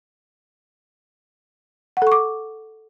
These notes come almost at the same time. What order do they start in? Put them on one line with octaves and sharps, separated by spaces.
F#5 A4 C#6 D6